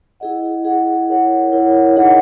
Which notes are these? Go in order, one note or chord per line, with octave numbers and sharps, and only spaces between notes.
E4 G#4 D#5 F#5
E4 G#4 D#5 F#5
E4 A#4 C#5 F#5
E4 A#4 C#5 F#5
D#4 G#4 D#5 F#5